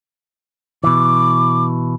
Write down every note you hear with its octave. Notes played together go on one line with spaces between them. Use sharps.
B2 E3 D6